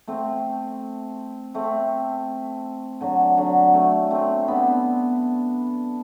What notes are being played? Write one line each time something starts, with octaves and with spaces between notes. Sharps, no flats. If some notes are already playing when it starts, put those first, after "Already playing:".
A3 C4
A3 C4
D3 F#3
D3 F#3
A3 C4
A3 C4
B3 D4